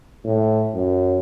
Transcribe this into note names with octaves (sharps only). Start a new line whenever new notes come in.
A2
F#2